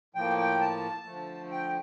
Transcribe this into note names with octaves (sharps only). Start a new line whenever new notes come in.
A2 F3 A#3 G5
G5
A5
D3 F3 A3
G5